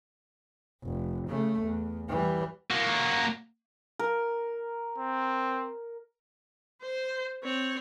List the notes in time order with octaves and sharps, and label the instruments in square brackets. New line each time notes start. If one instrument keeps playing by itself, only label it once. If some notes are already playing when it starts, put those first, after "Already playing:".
[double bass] F1
C#3 A3
E2
E3 G3
[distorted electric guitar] A#3 F#4
[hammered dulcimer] A#4
[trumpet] C4
[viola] C5
C4 C#5